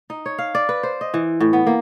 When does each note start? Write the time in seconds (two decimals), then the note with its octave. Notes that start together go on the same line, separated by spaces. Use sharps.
0.10 D#4
0.26 C#5
0.39 F5
0.55 D5
0.69 B4
0.83 C5
1.01 D#5
1.14 E3
1.40 A2
1.53 B3
1.67 A#3